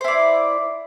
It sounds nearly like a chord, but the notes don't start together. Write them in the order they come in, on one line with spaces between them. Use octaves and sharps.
C5 E4 D5